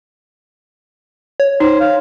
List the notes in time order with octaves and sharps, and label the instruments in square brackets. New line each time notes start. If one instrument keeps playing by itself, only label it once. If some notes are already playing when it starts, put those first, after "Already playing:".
[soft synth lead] C#5
[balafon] D#4 [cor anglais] C5
[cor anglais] F5